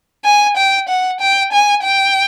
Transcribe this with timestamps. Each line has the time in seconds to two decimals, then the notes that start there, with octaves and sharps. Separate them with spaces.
0.25 G#5
0.57 G5
0.88 F#5
1.20 G5
1.52 G#5
1.84 G5